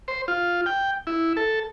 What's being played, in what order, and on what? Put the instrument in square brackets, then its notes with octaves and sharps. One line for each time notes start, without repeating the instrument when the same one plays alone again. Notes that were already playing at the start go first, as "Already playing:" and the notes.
[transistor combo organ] C5
F4
G5
E4
A4